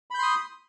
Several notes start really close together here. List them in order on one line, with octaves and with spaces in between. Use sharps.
B5 G6 C6 D#6